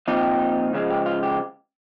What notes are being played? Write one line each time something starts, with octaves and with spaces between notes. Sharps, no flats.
A#2 F3 C4 D#4 G4
C#2 C#3 F3 G#3
G4
F4
G4